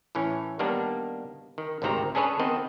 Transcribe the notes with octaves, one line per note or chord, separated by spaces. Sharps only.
A2 E3 C#4
D#3 G3 A#3 B3 D4
D#3
G#1 D2 C3 D#3 C4 A#5
C#4 D4 G#4 A4 B4 C#5
D#3 B3 C4 D#5